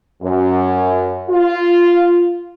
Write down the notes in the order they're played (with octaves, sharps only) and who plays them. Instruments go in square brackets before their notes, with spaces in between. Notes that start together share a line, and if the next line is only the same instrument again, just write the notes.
[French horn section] F#2
F4